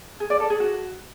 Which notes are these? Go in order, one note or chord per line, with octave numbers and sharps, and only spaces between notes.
G#4
D5
A4
G#4
F#4